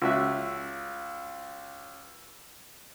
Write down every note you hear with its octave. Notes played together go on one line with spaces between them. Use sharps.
C#2 F#4 E5